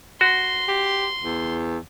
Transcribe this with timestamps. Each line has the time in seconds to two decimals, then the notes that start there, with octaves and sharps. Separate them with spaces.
0.21 F#4 C6
0.68 G4
1.24 E2